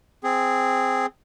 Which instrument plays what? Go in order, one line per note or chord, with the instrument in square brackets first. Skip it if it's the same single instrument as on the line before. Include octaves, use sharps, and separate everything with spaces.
[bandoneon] C4 G#4